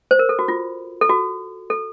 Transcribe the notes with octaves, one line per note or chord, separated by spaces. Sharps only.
C5
A#4
A4
F#4
F4
A4
F#4
A4